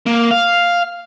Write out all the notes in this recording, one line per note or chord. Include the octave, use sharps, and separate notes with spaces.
A#3
F5